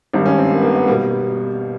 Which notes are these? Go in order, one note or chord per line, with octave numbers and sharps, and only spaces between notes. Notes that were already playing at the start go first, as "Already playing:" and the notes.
G#1 G2 D#3 G3 C4
C#4
C4
A#3
B3
A#3
B3
B2 G3 A#3